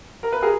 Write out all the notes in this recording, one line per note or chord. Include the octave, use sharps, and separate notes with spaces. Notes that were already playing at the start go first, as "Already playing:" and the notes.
A#4
B4
G#4 A#4